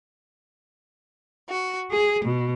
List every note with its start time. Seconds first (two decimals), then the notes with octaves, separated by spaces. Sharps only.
1.48 F#4
1.90 G#4
2.24 B2